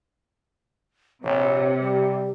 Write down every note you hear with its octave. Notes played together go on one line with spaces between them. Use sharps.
A#1 C3 C#5
G3 G4